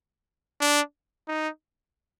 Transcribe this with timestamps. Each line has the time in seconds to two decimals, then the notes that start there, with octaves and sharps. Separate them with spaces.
0.61 D4
1.28 D#4